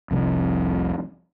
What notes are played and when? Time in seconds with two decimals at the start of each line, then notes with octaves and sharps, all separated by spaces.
0.11 F1 C2 F2